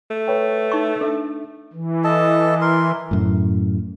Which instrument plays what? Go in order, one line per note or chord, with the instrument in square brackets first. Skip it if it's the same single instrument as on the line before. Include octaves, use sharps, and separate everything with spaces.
[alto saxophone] A3
[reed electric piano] B4 C#5 G5
[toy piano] D#4 C#6
[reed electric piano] D4 [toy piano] A4 E5
[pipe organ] E3
[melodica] A4 D#5 A5
A#4 C6
[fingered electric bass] F#2 A2